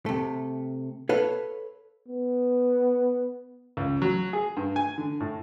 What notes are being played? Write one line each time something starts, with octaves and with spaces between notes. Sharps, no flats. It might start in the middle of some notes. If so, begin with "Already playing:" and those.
C3 A3
A4 B4 C#5 F5
B3
C#2
F#3
G#4
G2
G#5
D3
A2